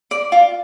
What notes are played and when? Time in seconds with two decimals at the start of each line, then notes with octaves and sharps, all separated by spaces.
0.11 D5
0.32 F4